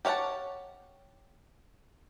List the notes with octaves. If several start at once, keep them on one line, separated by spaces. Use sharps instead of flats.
G4 C#5 F5 F#5 A5